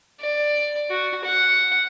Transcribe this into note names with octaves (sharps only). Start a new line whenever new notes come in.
D5
F#4
F#5